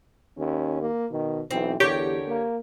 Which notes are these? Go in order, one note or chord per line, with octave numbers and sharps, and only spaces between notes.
D#2 C#4
A#3
B2 D#3
B1 E3 C4
E2 D3 G4 A#4 C#5
A#3